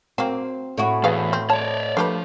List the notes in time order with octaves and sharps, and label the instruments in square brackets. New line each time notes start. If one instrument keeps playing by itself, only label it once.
[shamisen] F#3 A#3 [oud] C4
[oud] A2 E4 F#4
[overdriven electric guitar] E2 [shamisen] G#4 B4 F5
[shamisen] C4
[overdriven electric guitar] C#5 D5 [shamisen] A5
[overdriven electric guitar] F3 [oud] A3 [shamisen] D4 G4 B4